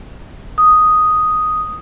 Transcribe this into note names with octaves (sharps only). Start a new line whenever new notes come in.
D#6